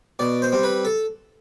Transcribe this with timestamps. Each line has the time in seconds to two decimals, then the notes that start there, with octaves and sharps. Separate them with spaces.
0.19 B2 D5
0.42 C5
0.52 G3 C4
0.63 B4
0.85 A4